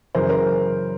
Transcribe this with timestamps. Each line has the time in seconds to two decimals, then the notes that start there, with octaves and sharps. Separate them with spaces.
0.15 F#2 C#3 E3 A#4 C5
0.29 A#4 C5